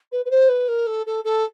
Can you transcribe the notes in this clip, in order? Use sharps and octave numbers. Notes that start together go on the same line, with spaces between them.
B4
B4
C5
B4
A#4
A4
A4
A4